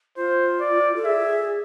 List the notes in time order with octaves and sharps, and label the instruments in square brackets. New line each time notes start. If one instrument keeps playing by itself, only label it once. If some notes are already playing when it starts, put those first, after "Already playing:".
[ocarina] F4 [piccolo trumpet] C5
[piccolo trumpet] D5
[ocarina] A4
[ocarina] G#4 [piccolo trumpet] E5